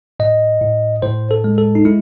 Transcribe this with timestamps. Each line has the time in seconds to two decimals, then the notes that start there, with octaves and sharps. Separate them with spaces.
0.20 A2 D#5
0.61 A2
1.02 A2 C5
1.31 A4
1.44 G#3
1.58 A4
1.75 D#4
1.85 G#3 E4